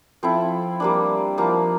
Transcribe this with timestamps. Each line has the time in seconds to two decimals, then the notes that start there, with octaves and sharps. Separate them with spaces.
0.23 F3 C4 E4 A4
0.80 G3 A#3 D4
1.38 F3 A#3 E4